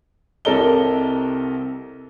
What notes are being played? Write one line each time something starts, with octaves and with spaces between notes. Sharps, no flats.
C2 C3 A4 A#4 D#5 G7